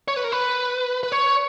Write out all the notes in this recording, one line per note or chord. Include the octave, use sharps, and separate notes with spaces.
C#5
B4
A#4
B4
B4
C#5